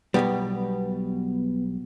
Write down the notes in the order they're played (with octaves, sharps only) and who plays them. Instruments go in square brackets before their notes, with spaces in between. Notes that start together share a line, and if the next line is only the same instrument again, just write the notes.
[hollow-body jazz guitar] B1 B2 G3 [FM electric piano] B3